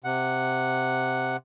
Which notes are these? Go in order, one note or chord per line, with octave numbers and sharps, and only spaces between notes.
C3 F#5